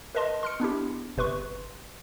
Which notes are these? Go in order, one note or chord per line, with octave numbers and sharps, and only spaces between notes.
A#4 B4 D#5 A5 C6
C6 F6 C#7
B3 D4 E4 G4
G1 C3 B4 C6 C#6